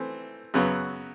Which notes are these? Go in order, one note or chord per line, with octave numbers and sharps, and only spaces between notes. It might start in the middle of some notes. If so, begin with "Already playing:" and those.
Already playing: E3 A3 C4
F#2 C#3 F#3 B3